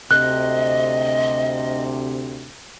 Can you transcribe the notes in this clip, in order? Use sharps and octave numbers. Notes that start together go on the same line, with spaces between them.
D2 C3 D#5 F#6